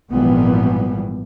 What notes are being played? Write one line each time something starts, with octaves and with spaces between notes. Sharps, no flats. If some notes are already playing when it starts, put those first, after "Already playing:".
G#1 A#2 E3 F3 G3 B3